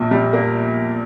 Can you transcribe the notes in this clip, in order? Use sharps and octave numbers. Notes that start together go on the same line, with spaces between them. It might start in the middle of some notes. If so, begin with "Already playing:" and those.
Already playing: A#1 A#2 A#3
G3
A#3